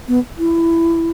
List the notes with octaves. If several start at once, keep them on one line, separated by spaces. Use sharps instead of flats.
B3
E4